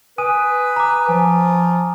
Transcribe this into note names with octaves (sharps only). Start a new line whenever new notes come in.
B4 G#5 D#6 D#7
A#5 D6
F3 G#5